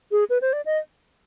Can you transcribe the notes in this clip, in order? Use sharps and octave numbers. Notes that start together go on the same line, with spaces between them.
G#4
B4
C5
D5
D#5